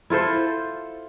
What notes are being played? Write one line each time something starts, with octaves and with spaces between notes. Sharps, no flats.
E4 F4 A4 C5